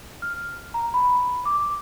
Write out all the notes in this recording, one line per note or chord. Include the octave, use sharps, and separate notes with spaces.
F6
A#5
B5
D6